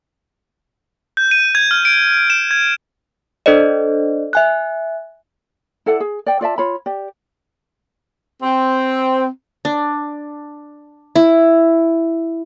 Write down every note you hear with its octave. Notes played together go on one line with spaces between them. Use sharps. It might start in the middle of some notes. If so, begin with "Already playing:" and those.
G6
D#7
G#6
F6
D7
E7
G#6
D4 A4 C5 D5 D#5
E5 G#5 F#6
E4 A4 D5 F#5
G#4
D5 G5
F4 D5 E5 A5
F4 C#5 B5
G4 D5
C4
D4
E4